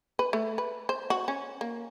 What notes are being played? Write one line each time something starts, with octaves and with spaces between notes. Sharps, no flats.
B4
A3
B4
C5
F#4
C#4
A#3